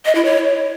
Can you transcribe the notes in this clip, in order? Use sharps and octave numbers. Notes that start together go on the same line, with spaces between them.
D#5
E4
C#5